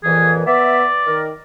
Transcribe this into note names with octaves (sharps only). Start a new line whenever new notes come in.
F2 A#2 E3 G#4
B3 D5 E5
D#3 A#4